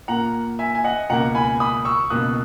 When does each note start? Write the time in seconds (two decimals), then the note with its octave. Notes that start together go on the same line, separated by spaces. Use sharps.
0.08 A#2 A#3 F#5 A#5
0.59 E5 G#5
0.75 G#5
0.84 D#5 F#5
1.10 C#2 B2 A#3 F#5 A#5
1.35 G#5 B5
1.60 B5 D#6
1.85 C#6 E6
2.10 C#2 B2 A#3 D#6 F#6